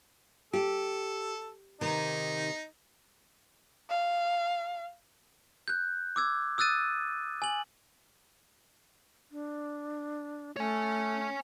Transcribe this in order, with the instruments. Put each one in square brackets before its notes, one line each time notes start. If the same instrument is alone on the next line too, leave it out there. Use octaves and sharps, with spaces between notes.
[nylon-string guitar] G4 [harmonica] A4
[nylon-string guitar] C3 D#3 [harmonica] D#4
[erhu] F5
[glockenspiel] F#6 G6
D6 E6 G#6
D#6 E6 F#6 A6 D#7
G#5 F#7
[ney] D4
[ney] A3 [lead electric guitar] C#5 G#5